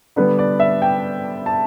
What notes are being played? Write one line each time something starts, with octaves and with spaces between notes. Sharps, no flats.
D3 G3 B3 B4
D5
E5
G5
A5